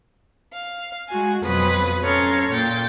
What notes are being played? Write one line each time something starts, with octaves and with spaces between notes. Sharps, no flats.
F5
G#3 F#4 G#5
F2 B2 F#3 B4 B5 D#6
C#4 A4 C#5 F5 A#5 C6
A#2 G5 A6